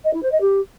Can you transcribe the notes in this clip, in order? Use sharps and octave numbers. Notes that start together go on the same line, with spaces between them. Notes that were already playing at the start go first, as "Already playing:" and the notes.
D#5
E4
C5
D#5
G4